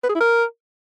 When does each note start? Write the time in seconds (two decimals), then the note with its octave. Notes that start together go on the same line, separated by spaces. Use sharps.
0.04 B4
0.09 G#4
0.15 E4
0.21 A#4